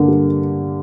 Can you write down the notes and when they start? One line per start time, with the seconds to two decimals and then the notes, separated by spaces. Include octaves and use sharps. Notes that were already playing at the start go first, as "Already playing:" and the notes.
Already playing: G2 D3 A#3
0.08 G3